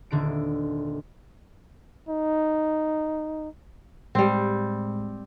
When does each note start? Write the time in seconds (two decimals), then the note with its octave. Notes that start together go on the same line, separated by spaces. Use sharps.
0.11 D#1 D3 D7
2.09 D#4
4.15 A2 G3 G#3 C4